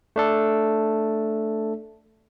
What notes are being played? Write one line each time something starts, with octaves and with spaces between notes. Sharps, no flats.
A3 D4 A4